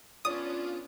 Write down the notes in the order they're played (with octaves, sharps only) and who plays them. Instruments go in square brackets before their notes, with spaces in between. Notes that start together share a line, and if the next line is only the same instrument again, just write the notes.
[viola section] B3 C#4 D4 [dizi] F4 [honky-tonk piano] C#5 D5 D#7 [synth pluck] D#6